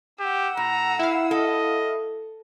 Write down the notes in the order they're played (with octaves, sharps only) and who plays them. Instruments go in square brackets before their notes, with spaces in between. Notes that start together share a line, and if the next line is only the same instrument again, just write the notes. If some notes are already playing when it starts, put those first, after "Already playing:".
[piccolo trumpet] G4 [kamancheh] F#5 E6
[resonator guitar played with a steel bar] A2 [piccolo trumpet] A#5
[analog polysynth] E4 F5
[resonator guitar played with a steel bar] A4 [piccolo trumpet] D#5